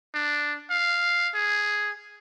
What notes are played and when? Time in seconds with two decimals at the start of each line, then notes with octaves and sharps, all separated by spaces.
0.14 D4
0.71 F5
1.34 G#4